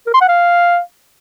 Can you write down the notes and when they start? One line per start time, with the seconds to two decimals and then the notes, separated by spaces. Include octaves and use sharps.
0.07 A#4
0.14 C6
0.21 F#5
0.28 F5